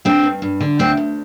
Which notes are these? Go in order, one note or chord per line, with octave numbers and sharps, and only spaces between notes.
D3 C4
G2
G2
D3
D2 C4
D2